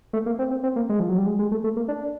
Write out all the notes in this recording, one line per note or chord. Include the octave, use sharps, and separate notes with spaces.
A3
A#3
C4
C4
C4
A#3
G#3
F3
F#3
G3
G#3
G#3
A3
A3
A#3
D4